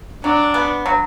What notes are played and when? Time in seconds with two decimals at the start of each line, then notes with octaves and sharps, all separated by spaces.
0.23 F#3 D4
0.54 B3
0.86 F#3